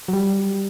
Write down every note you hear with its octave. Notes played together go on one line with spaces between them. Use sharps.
F#3
G3